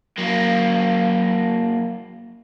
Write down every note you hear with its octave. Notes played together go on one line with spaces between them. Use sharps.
F#3 A#3